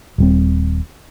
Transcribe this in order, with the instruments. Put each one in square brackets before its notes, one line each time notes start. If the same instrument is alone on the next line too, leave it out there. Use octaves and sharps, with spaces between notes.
[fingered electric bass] D#1 G3 C4